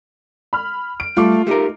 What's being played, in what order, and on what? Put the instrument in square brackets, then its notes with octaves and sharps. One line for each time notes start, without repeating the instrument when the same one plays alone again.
[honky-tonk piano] B5 F6
D7
[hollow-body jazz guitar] G3 [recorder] A3 [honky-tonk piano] F4 D6
[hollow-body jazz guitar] A3 D#4 A#4 [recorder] G4